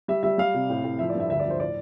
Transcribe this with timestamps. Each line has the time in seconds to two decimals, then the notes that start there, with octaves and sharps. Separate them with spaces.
0.08 G3 E5
0.23 G3 E5
0.38 G3 F5
0.54 C3
0.70 A2
0.84 A2
0.99 F3 E5
1.10 D5
1.15 G2 E5
1.30 D2 E5
1.40 D5
1.45 F3 C5
1.60 A2 D5